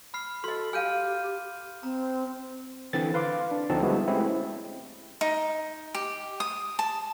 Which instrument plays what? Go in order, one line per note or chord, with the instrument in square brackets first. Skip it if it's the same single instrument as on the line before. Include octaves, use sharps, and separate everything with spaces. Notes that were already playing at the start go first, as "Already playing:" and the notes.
[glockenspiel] B5 F6 C7
[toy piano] F#4 D#5 [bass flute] A4 [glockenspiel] C6
[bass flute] G4 [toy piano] F5 G#5 [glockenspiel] F6 G6 D#7
[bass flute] C4 [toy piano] A#5
[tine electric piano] D3 E3 C4 A6
B4 F5 C6 D6
D4
D2 D3 F3 C4 D#4 A5
G3 G#3 B3 E4 F#4
G#3 A3 C4 C#4 E4 G4
[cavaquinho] D#4
G4
D#6
A5